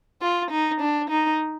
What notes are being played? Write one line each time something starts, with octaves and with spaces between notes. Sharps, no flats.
F4
D#4
D4
D#4